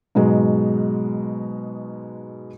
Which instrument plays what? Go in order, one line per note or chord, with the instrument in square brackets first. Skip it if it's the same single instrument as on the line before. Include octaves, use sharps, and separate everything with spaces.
[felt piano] G#2 B2 F#3 G#3